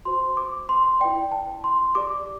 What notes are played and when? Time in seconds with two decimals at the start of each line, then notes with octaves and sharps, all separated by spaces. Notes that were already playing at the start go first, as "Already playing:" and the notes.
0.05 F#4 C5 C6
0.37 D6
0.69 C6
1.00 E4 B4 D5 G5
1.32 A5
1.64 C6
1.95 G4 D5 D6